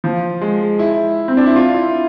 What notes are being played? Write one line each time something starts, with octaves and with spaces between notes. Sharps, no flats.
F3
G#3
E4
C4
D4
E4
F4
E4